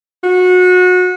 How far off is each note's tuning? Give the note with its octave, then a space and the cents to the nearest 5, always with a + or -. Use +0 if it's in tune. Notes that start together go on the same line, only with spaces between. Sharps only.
F#4 -25